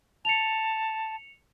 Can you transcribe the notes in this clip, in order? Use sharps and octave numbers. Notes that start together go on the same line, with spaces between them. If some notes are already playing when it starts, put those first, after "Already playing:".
A5 C#7 F7